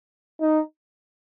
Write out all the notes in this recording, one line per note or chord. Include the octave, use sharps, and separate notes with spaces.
D#4